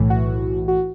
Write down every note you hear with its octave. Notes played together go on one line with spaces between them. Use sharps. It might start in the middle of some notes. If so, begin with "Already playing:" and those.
Already playing: B1 A2 E3
F#4
F#4